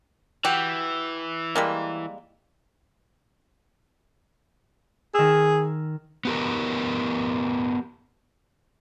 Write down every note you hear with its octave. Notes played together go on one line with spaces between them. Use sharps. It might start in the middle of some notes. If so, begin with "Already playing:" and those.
E3 F#4 G4
G3 G#3 A#3
D#3 G#4 E6
B3 G4 A#4